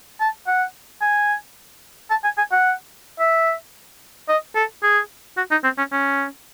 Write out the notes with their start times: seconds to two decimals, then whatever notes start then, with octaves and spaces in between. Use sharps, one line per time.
0.20 A5
0.47 F#5
1.01 G#5
2.11 A5
2.24 G#5
2.38 G#5
2.52 F#5
3.20 E5
4.29 D#5
4.56 A4
4.83 G#4
5.37 F#4
5.51 D#4
5.64 C4
5.78 C#4
5.92 C#4